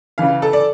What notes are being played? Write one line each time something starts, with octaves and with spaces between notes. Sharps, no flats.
C#3 E3 F5
A4
D5